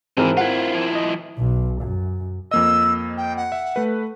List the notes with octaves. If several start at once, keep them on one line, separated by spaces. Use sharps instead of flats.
G#1 C#2 E3 C4 A#4
E4 F4 F#5
F3 E4
D#5
B1
F#2
F2 A#3 D#5 E6
G5
F#5
E5
A3 B4